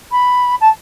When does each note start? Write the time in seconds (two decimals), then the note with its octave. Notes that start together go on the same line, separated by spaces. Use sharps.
0.11 B5
0.60 A5